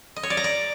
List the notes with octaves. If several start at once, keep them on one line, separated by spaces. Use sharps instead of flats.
D#5
C#5
D5
A#5
D5